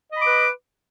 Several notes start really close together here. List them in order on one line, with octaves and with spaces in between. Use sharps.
D#5 B5 D6 B4